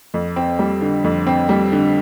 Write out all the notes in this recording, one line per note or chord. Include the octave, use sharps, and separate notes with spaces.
F2
C4
G3
D3
F2
C4
G3
D3